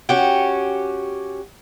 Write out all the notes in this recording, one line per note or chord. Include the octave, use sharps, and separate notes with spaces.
C#4 F#4 G4